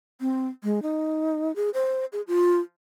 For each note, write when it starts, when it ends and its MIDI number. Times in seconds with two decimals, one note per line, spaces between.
0.21 0.47 60
0.64 0.82 56
0.82 1.54 63
1.56 1.70 68
1.74 2.05 72
2.13 2.22 68
2.27 2.59 65